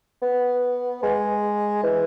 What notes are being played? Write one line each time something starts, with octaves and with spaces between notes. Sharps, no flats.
B3
G#3
E3